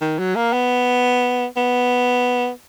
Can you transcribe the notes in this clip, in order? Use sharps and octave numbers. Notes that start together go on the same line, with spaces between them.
D#3
F#3
A#3
B3
B3